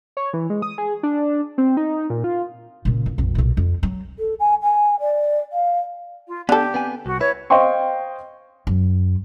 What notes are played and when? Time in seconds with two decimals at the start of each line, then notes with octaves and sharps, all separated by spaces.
0.17 C#5
0.33 E3
0.50 G#3
0.62 D#6
0.78 G#4
1.03 D4
1.58 C4
1.77 D#4
2.10 A#2
2.24 F4
2.85 A#2 C#3
3.06 A1
3.18 A#1 F2
3.35 B1 A#2
3.57 F2
3.83 F#3
4.19 A4
4.40 G#5
4.63 G#5
5.00 D5
5.53 F5
6.28 F4
6.49 D3 B3 D4 G4 A4
6.74 B3 C4 G#5
7.06 C2 F#4
7.21 E4 B4 C#5
7.50 C5 D#5 F5 G5 C6 C#6
8.67 F#2